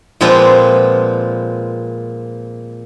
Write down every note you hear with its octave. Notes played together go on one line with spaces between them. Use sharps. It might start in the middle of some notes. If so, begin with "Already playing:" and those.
A#2 F3 G#3 B3 C4